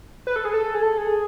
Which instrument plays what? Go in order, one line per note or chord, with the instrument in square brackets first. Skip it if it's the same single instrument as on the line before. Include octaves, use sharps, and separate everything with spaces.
[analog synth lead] B4
A4
G#4
A4
G#4
A4
G#4